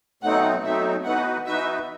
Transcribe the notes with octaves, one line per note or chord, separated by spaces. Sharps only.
B2 F#3 A3 C4 D#4 F#5
B2 F#3 A3 C4 D#4 E5
E3 B3 D#4 F#4 B4 F#5
E3 B3 D#4 F#4 B4 E5